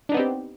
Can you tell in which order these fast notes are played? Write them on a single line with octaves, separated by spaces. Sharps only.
D4 D#4 B3 C4 G4